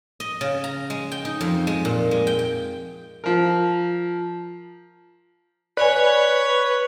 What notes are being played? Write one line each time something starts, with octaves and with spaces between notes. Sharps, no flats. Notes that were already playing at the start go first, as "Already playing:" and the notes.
D#5
C#3
A#5
G#3
G5
D#4
F2
G#3
A#2
G#3
G5
G5
F3 A#4
B4 C#5 D5 G#5